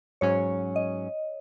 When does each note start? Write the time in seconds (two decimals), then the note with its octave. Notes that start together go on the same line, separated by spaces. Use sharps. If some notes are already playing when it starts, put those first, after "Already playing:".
0.21 G#2 F#3 C#4 C#5
0.76 D#5